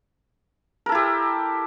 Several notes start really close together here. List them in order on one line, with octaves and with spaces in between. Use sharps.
A#4 A4 E4 G4